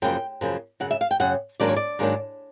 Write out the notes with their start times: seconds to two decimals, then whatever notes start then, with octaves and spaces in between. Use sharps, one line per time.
0.02 F#2 C#3 F3 A#3 G5
0.41 F#2 C#3 F3 A#3
0.80 F#2 C#3 F#5
0.91 E5
1.01 F5
1.11 G5
1.20 F#2 C#3 F#5
1.60 G#2 D#3 F#3 A#3 D4 D5
1.69 C#5
1.76 D5
1.99 G#2 D#3 F#3 A#3 D4